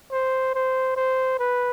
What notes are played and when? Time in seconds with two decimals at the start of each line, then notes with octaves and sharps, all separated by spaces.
0.12 C5
0.55 C5
0.96 C5
1.39 B4